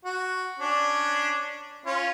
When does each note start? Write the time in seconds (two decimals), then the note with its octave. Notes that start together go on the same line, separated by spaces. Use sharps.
0.05 F#4
0.59 C#4 D4
1.86 C#4 F4